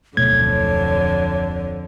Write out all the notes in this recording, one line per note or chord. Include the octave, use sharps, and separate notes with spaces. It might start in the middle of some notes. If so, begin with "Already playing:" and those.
D1 F2 B2 D3 A3 C#5 G#6